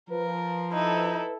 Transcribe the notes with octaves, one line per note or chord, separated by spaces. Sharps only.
F3 A#4 B4
D#4 E4 A4